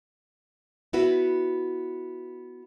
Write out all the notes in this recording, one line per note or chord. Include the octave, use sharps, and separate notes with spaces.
B3 E4 F#4 B4